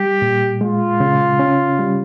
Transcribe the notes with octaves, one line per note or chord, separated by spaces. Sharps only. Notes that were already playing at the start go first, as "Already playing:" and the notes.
Already playing: G3 G4
A#2
G#3 F4
C#3
C#4
G3